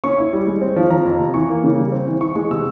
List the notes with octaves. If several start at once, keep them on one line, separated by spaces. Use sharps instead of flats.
C#4 C#6
E4
G3
G#3
C4
F3
F3 A#5
F2
C3
E3 C#6
A#3
C#3
G3
C4
E3
E3 C#6
G#3 C#6
C3 E6